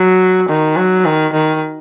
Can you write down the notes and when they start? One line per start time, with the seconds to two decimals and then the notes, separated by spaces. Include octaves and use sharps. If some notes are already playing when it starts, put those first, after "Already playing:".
Already playing: F#3
0.48 D#3
0.77 F#3
1.05 D#3
1.33 D#3